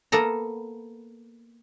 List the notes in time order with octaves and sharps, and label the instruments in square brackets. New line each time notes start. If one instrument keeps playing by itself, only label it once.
[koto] A#3 B3 A4 A#5